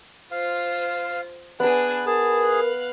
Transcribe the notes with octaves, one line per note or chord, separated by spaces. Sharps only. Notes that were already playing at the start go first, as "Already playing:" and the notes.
F4 C5 F5
B3 D4 G#4 B4 F#6
G#4 A#4 A5
F5 F#6